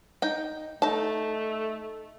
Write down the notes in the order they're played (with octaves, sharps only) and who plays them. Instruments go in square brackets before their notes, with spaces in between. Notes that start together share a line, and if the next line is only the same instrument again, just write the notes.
[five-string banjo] D#4 G5
[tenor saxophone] A3 [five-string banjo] D#4 A5